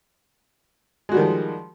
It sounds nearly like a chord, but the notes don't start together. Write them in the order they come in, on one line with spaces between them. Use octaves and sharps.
G#3 F#4 G3 D#3 F3